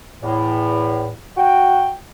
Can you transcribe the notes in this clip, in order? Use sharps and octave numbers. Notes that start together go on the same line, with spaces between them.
E2 A2
F#4 G5